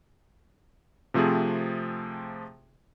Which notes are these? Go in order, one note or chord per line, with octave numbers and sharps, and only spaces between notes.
C3 F3 A3 C4 G#4